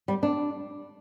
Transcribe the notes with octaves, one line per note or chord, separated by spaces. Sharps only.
G3
D4